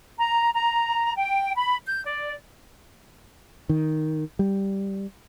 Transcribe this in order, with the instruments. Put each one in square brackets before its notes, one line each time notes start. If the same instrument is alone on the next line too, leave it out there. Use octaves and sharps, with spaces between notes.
[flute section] A#5
A#5
G5
B5
G6
D5
[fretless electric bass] D#3
G3